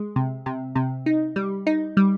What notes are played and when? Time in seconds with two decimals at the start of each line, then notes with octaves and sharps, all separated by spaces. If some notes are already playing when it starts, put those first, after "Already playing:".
Already playing: G#3
0.16 C3
0.46 C3
0.76 C3
1.06 D#4
1.36 G3
1.67 D#4
1.97 G3